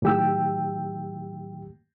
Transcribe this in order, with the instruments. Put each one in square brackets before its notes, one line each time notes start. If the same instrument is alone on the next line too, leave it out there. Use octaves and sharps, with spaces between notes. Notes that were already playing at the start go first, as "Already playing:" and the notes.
[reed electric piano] A2 D#3 F#3 G4 G5 E6